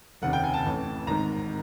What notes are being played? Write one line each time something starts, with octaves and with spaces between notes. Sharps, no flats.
F1 D#2 C#3 F#5
G5
G#5
A5
A1 A2 E3
G#1 G#2 D#3 A#5